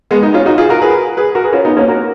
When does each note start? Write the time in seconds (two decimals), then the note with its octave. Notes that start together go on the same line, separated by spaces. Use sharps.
0.11 G#3 B3
0.22 B3 D#4
0.34 C#4 F4
0.46 D#4 F#4
0.58 F4 G#4
0.69 F#4 A#4
0.82 G#4 B4
1.17 G#4 B4
1.35 F#4 A#4
1.44 G#4 B4
1.53 C#4 F4
1.65 B3 D#4
1.77 A#3 C#4
1.88 F#4 A#4